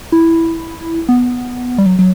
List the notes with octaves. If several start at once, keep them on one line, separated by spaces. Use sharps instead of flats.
E4
B3
G3
F#3
F#3